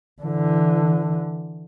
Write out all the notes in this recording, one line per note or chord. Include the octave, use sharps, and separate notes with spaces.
D3 E3